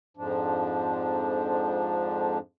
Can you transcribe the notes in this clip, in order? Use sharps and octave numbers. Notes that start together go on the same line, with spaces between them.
F2 G#2 F3 D4